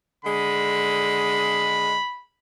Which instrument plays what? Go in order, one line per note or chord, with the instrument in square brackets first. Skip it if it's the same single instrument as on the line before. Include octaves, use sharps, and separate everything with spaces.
[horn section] D3 G#3 [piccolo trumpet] B5